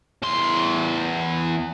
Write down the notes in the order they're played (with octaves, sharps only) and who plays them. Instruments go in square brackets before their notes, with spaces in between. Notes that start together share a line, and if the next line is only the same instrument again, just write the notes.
[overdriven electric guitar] E2 C6